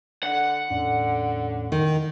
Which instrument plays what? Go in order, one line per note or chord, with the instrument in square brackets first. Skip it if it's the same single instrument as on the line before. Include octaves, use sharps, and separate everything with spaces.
[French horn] D3 [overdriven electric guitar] F#5
[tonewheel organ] E2 A2 C#4 [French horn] D3
[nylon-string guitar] D#3